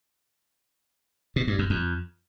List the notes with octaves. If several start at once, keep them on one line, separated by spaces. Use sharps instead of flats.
B2
G2
F#2
F2